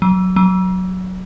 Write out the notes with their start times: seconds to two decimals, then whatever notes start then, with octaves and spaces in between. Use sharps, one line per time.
0.02 F#3
0.36 F#3